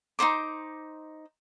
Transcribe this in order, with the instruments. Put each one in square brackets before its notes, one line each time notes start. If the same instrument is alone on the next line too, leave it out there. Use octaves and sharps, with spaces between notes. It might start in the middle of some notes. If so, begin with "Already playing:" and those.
[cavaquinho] D#4 F4 C5 D6